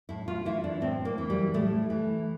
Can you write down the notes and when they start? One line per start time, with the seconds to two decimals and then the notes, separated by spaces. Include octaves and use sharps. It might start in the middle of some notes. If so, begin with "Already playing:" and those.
0.09 A2 E4
0.28 F4
0.45 E3 E4
0.64 D4
0.81 A2 C4
1.05 A#3
1.18 E3
1.30 G3
1.54 A2 A3
1.90 E3